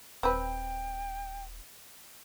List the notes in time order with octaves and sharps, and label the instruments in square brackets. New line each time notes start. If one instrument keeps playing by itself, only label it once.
[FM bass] D#1 [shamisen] C4 B4 [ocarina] G5